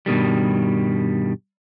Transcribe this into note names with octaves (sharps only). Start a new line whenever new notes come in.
G2 B2 D#3 G3